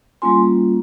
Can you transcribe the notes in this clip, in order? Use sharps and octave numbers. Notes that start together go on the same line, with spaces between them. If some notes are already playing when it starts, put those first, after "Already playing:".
G3 A#3 C#4 F4 G#5 C6